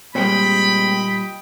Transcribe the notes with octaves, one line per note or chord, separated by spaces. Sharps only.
A#2 G3 G#3 A#3 C4 D#5 G5 B5